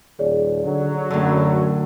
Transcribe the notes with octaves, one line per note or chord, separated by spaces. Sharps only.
D#1 G#4 C#5 D5
D3 F#3
F#2 A2 D3